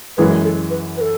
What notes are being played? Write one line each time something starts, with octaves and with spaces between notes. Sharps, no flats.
F#2 E3 G#3 B4
A4
B4
B4
A4